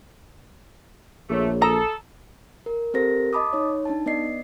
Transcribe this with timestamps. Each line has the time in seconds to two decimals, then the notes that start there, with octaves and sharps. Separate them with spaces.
1.30 A#1 A3 G#4 C#5
1.62 A4 A#5 D#6 E6 E7
2.66 A#4
2.94 C4 G4 A4 A#4 C5 A#6
3.33 D#5 A5 B5 D6 D#6
3.53 D#4 C#5
3.85 D4 D#4 A5
4.06 B3 D5 D#5 C7